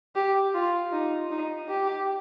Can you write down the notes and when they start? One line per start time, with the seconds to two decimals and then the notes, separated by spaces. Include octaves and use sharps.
0.15 G4
0.54 F4
0.92 D#4
1.30 D#4
1.68 G4